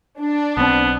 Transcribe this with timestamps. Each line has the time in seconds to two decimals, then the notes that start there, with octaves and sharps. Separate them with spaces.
0.20 D4
0.57 B1 B3 C4